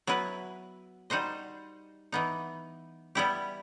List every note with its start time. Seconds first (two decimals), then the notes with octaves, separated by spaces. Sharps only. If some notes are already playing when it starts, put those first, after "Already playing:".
0.07 F#3 B3 E4 B4
1.10 G3 D#4 F#4 C5 D#5
2.12 E3 B3 D#4
3.15 G3 B3 E4 G4